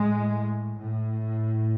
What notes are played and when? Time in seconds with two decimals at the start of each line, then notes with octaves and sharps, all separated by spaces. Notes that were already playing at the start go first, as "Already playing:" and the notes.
Already playing: A2 G#3
0.78 A2